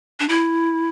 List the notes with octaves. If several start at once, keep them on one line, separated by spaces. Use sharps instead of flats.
D4
E4